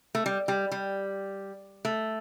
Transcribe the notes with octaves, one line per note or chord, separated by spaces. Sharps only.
A3
G3
G3
G3
A3